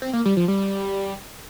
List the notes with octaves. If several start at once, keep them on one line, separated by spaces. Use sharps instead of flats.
C4
A#3
G3
F3
G3